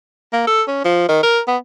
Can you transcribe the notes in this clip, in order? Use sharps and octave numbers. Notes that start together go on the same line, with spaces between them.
A#3
A4
C#4
F3
D#3
A#4
B3